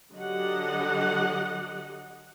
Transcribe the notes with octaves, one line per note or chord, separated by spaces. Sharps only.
D3 F#3 G4 D#5 F#5